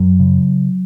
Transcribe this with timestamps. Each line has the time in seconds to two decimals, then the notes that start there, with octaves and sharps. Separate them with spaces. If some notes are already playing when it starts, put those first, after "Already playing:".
Already playing: F#2 F#3
0.19 C#3